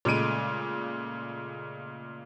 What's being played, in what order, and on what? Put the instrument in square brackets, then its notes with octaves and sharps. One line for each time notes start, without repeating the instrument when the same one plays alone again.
[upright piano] A#2 C#3 G#3 A3 D7 D#7